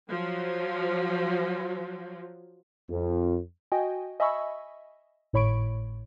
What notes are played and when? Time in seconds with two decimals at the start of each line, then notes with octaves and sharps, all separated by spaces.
0.10 F3 F#3
2.89 F2
3.72 F#4 D#5 G5 G#5
4.20 D#5 E5 G#5 B5 C#6 E6
5.33 G#1 A2 C#5 B5 C#6 D7